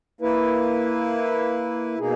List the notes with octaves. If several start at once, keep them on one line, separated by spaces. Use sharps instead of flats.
A#3 E4 B4
B2 A#3 D#4 G#4